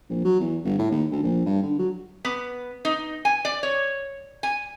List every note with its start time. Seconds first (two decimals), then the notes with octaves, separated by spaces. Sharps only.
0.10 A#1
0.25 F#3
0.40 E2
0.64 G1
0.79 A2
0.91 D#2
1.11 D2
1.23 A#1
1.46 G2
1.63 D3
1.79 F#3
2.25 B3
2.85 D#4
3.25 G#5
3.45 D5
3.63 C#5
4.43 G#5